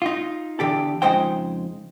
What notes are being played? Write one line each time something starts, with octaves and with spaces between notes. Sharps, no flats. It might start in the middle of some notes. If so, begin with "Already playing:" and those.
D#4 F4
E2 D3 G4 A4
F2 C#3 G#3 D#4 C5 G5